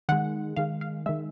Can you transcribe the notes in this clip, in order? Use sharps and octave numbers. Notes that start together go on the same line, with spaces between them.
D#3 G#3 F#5
D#3 G#3 F5
F5
D#3 G#3 E5